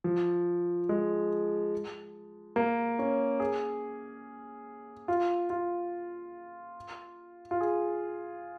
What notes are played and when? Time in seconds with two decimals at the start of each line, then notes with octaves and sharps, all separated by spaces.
0.04 F3
0.89 G#3
2.56 A#3
2.99 C#4
3.40 G#4
5.08 F4
5.50 F4
7.51 F4
7.61 G#4